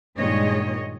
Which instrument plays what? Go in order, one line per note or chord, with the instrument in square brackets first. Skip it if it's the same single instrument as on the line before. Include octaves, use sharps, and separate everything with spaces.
[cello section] G2 A#2 D#3 G#3 C#5 D#5